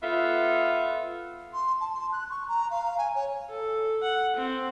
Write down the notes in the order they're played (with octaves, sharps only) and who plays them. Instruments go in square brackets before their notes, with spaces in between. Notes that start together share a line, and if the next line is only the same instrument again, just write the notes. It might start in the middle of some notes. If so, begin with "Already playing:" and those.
[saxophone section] B3 F4 A4 E5
[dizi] C6
A5
C6
F#6
C#6
A#5
F5
G#5
C#5
[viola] A4
F#5
C4